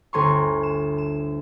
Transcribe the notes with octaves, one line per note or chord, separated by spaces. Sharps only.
G1 D2 G#5 A#5 C6 C#6
E7
E7